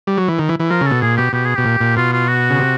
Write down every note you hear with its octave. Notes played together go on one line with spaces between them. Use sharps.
G3
F#3
E3
D#3
E3
E3
F3 A#4
C#3
B2 A4
A#2 G#4
B2 G4
B2 G4
G#4
B2 G4
A#2
A#2
B2 F4
F4
F#4
C#3
C3